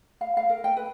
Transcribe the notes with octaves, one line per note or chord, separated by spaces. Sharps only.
F5
F5
A#4
G5
B4